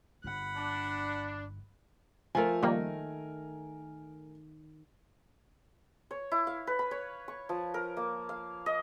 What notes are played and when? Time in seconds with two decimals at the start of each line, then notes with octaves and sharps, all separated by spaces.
0.24 G1 F#5 B5
0.56 D4
2.35 F3 A3 A#4 G#5
2.63 D#3 F3 G3 A#3
6.11 C#5
6.31 E4
6.47 F5
6.67 B4
6.79 B5
6.91 C#5
7.28 C#6
7.49 F3
7.74 A#4
7.97 A#3
8.29 F5
8.66 D#5